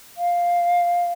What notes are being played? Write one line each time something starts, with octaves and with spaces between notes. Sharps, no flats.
F5